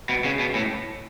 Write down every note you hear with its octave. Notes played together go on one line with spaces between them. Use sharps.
B2
C#3
B2
A2